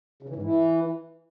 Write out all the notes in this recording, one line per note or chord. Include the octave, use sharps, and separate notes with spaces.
C#3
E3
G#2
E3